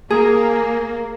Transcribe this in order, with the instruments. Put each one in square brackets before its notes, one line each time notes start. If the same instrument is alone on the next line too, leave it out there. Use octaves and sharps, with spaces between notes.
[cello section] A#3 [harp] G#4